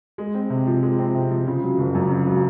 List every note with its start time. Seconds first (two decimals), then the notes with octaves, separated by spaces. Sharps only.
0.18 G#3
0.34 C4
0.50 C3
0.67 F3
0.83 G#3
0.99 C4
1.14 C3
1.31 F3
1.47 C#3
1.63 F#3
1.78 F#1
1.95 F#2
2.10 C#3
2.26 F#3